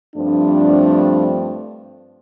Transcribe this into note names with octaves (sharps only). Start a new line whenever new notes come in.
G2 F3 A3 C4 D4